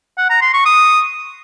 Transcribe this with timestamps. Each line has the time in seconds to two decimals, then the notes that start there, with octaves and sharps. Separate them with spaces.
0.18 F#5
0.30 A#5
0.42 C6
0.54 C#6
0.65 D#6